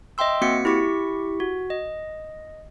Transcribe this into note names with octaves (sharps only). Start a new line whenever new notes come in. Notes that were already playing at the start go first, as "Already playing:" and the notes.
D#5 E5 G5 C6 E6
A#3 C4 F#4 F#5 B6 C#7
E4 G4 C#6 B6
F#4
D#5